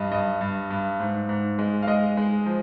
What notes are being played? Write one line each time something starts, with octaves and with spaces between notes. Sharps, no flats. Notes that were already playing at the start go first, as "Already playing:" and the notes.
Already playing: G2 G3 D#5
G2 D#5
G2
G2
G#2
G#2
G#3
F5
G#3 D#5
G#3
F3